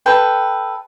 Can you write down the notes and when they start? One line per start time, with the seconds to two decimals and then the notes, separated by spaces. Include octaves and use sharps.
0.06 A4 B4 G5